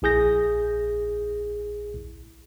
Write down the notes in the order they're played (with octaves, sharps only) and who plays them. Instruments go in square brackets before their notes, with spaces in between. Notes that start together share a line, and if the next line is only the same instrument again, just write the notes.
[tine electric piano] A#1 E4 G#4 G6 A#6